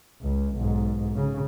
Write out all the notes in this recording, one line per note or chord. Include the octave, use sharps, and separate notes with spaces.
C#2
B1 G#2
C#3